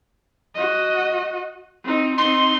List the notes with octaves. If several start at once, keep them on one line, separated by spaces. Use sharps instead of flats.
F#4 D#5
C4 D#4
C4 D#4 C6